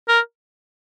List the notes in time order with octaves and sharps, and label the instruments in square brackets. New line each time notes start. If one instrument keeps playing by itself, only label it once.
[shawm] A#4